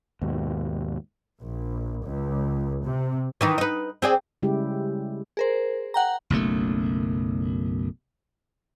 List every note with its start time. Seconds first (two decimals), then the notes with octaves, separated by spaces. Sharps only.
0.21 D#2 G#2 B2
1.41 A#1
2.04 C#2
2.84 C3
3.41 D#3 E3 D#4
3.58 D#4 B4
4.02 C4 G#4 D5
4.43 C#3 G3 G#3 E4 G4
5.37 G#4 A#4 C5
5.94 F#5 G5 A#5
6.30 F#1 B1 F#2 A3